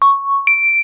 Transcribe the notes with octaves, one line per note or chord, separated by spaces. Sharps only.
C#6
D7